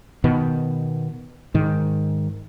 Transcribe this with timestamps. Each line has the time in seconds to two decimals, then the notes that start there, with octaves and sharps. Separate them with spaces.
0.24 B2 D#3 B3
1.54 G#2 D#3